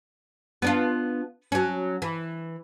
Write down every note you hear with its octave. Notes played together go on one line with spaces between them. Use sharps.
B3 D4 F4
F#3 C#4
E3